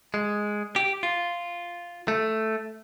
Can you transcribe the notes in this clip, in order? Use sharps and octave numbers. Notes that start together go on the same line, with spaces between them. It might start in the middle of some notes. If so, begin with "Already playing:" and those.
G#3
G4
F4
A3